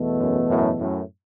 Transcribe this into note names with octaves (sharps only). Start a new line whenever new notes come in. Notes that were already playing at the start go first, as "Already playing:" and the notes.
Already playing: E2 B2 A3
F#2
F#2 A2
F#2 A2